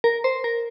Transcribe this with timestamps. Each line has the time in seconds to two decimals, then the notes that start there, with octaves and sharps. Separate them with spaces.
0.04 A#4
0.24 C5
0.44 A#4